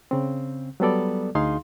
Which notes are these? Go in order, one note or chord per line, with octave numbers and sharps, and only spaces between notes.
C#3 C4
F#3 G3 B3 A4 D5
D2 D#4 G#4 F5 C6